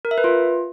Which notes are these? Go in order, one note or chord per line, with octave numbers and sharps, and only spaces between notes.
A#4
E5
B4
F4